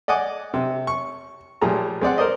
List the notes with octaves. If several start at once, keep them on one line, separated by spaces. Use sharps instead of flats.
D5 D#5 F#5 G#5 D6
C3
C#6
A#2 F3 G3 A3 G#4 A#5
G#3 C4 D5 F#5
A#4 C5 D5 D#5